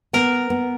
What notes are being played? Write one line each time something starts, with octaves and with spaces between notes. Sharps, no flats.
B3 A#4
B3